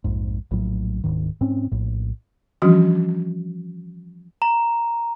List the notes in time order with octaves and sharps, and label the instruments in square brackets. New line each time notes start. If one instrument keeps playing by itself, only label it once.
[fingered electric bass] A#1 F2 G#2
A#1 A2 F#3
D1 G#2 D#3
G#2 C4 C#4
A#1 A2
[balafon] E3 F3 G3 C#4 D4 F#4
[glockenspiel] A#5